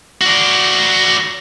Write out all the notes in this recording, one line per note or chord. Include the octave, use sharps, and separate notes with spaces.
F#4 D5